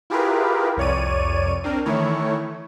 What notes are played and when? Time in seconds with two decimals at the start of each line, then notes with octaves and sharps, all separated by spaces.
0.10 E4 F4 G4 G#4 A#4 B4
0.77 C2 F2 C#5 D5 D#7
1.64 C4 D4 A#4
1.86 D#3 E3 A3 E4 C#5